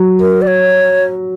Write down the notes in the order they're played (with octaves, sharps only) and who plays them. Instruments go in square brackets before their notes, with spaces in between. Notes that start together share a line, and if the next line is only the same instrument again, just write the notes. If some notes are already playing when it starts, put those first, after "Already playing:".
Already playing: [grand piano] F#3
[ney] A#4
D5
C#5